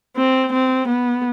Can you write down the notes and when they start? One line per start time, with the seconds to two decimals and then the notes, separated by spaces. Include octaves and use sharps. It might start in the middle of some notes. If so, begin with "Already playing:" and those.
0.16 C4
0.52 C4
0.88 B3